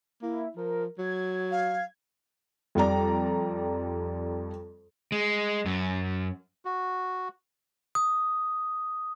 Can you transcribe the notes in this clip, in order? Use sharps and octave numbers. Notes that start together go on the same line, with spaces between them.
A#3 E4
F3 A#4
F#3 G#6
F5
F2 G3 D5 A#5
G#3
F#2
F#4
D#6